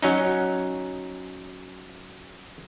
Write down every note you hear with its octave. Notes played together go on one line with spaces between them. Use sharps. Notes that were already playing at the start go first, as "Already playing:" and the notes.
F#3 C#4 D#4